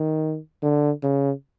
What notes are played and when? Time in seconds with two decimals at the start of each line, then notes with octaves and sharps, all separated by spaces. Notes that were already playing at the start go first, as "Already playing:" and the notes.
Already playing: D#3
0.63 D3
1.03 C#3